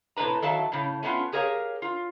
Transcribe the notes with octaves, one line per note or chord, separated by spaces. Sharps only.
A2 C3 A4 B4 A#5
D#3 F#3 A4 E5 F5 A5
A2 C#3
A3 B3 C#4 E4 F4
G4 G#4 A#4 C#5 F5
F4